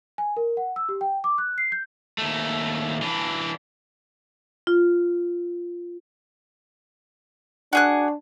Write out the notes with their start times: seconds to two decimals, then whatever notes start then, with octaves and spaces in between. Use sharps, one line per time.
0.18 G#5
0.37 A#4
0.57 F#5
0.76 E6
0.89 G4
1.01 G5
1.24 D6
1.38 F#6
1.58 C7
1.72 G6
2.18 D#2 A3
3.02 E3 D4
4.67 F4
7.73 D4 F#4 G#4 F#6